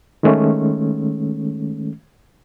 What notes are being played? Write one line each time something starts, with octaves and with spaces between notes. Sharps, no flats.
D#3 G#3 A3 C#4